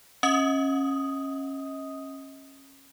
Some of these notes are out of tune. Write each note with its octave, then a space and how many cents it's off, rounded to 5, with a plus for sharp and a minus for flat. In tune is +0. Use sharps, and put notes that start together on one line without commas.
C#4 -25 D#5 +35 D#6 +0